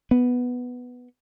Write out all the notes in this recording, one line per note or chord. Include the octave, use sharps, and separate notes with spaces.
B3